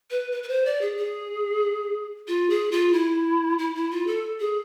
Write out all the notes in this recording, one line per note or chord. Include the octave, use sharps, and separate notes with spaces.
B4
B4
B4
C5
D5
G#4
G#4
F4
G#4
F4
E4
E4
E4
F4
A4
G#4